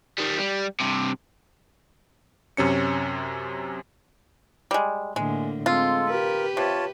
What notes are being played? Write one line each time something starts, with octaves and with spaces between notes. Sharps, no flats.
D#3 G3
G3
G2 C3
F#2 C3 C#4 C#7
G3 G#3
A2 D3 G#3 A#3
G#3 C4 F4 A4
G4 A#4 B4
C3 F4 C#5 A5